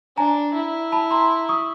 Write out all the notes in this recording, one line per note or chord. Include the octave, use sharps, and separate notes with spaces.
D4 G#5 A#5
E4
A5 B5
A#5 C6
C#6 D#6